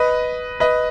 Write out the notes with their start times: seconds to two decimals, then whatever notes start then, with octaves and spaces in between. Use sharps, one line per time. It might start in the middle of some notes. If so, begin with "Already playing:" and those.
Already playing: B4 D#5
0.60 B4 D#5